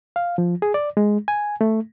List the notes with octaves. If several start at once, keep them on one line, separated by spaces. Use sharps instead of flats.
F5
F3
G#4
D5
G#3
G#5
A3